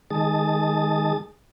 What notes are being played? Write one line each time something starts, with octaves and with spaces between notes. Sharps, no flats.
D#3 G#3 G#4 A5 D#6